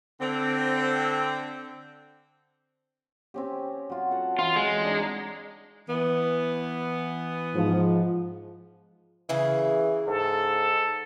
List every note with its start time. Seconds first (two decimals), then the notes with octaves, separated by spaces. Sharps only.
0.21 D3 C4
3.34 C4 C#4 G4
3.90 F#3 F4
4.11 A4 D#5 F#5
4.39 E3 F4
4.56 G#3
4.83 D4 D#4 A#5
5.89 E3 B3
7.55 G#2 F3
9.29 C#3 E3 G#4
10.07 G#2 A4